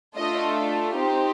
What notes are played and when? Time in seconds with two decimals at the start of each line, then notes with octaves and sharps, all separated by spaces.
0.18 A3 D4 F4 A4 D#5
0.97 C4 D#4 G4